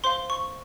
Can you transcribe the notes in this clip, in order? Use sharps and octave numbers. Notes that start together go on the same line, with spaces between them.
C5 F5 C6
C#6